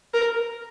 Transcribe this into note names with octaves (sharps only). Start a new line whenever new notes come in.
A#4